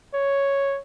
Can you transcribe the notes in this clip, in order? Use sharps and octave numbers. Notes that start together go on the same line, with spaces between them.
C#5